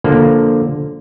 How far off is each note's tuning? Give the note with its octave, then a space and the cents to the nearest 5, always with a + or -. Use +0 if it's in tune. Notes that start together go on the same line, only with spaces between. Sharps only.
D3 +0 F3 +0 A#3 +0